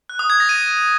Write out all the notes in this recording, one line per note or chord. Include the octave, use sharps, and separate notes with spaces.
F#6
D#6
G#6
A#6
D#7